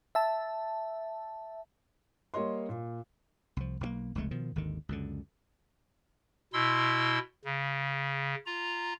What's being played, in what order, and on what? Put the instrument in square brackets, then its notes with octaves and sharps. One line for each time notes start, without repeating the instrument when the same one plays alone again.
[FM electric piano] E5 A5
[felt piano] G3 A#3 C#5 D#5 C6
A#2
[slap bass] C2 F3
B1 F3 A#3
F1 C#2 G#3 A3
B2 D#3 F3
G#1 D#2 D3 D#3
C#2 F#2 D3
[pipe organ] B2 E4 C6 E6
C#3
F4 A#5